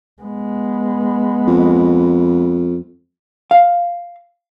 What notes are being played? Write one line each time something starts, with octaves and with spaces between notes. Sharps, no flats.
G#3 B3
F2
F5